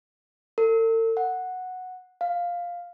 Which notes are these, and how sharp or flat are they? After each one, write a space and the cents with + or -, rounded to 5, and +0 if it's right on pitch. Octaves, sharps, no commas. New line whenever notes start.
A4 +45
F#5 -5
F5 +5